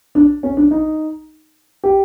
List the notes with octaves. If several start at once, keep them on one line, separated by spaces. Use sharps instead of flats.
D4
C#4
D4
D#4
G4